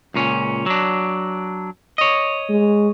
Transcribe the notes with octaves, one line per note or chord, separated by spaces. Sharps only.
C#2 A#2 C#4
F#3 D4
C#5 D#5
G#3